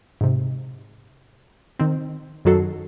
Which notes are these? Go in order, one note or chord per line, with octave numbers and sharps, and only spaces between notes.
G#2 C3
D#3 C4
F#2 D#3 F#3 F#4 A4 C7